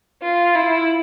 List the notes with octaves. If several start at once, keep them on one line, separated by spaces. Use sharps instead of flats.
F4
E4